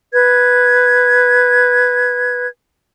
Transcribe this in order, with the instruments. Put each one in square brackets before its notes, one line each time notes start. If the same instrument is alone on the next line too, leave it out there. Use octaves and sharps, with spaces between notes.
[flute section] B4 G#6